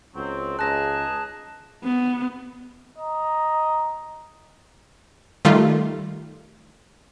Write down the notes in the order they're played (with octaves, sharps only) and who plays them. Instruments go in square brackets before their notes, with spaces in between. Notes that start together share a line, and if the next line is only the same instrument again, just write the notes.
[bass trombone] C#2 [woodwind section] F#3 C4
[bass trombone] C#2 [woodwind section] D#4 G#4 [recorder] A5 [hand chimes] F#6 A#6
[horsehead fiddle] B3
[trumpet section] D#5 A#5
[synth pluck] D#3 G3 A3 F4